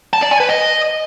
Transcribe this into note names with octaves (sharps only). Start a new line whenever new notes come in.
A5
D5
G#5
B4
D#5